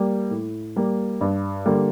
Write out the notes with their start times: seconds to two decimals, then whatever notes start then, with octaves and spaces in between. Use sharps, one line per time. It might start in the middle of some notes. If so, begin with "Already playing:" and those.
Already playing: G3 A#3
0.31 A2
0.76 G3 A#3
1.21 G2
1.66 D3 G3 A#3